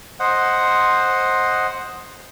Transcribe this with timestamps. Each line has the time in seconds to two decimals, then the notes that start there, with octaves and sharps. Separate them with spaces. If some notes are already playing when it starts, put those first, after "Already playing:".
0.20 C5 D#5 F#5